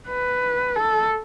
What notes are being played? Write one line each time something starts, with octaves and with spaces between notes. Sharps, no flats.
B4
A4